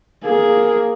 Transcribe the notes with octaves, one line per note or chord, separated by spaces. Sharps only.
A#3 G#4